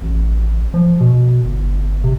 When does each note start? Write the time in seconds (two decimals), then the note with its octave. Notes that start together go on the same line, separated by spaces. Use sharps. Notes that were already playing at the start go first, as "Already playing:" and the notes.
0.02 A1
0.74 F3
1.00 B2
1.44 G1
2.04 C3